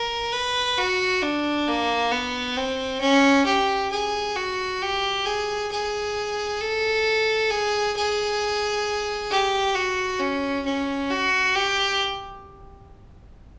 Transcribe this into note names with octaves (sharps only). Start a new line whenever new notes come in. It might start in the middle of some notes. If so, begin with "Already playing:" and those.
Already playing: A#4
B4
F#4
D4
A#3
B3
C4
C#4
G4
G#4
F#4
G4
G#4
G#4
A4
G#4
G#4
G4
F#4
C#4
C#4
F#4
G4